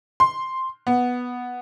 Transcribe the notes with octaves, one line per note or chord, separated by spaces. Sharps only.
C6
B3